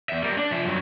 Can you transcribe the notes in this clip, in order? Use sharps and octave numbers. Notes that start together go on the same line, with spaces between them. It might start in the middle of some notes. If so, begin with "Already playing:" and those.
E2 E5
G3 A#3
D4
F3 E5
G2 F#3